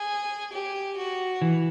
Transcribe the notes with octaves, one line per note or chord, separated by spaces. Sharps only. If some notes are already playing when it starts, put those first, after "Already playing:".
Already playing: G#4
G4
F#4
E3